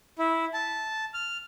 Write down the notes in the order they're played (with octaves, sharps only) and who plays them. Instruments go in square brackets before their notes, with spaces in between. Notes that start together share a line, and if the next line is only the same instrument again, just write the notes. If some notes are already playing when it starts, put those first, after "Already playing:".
[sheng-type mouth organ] E4
A5
F6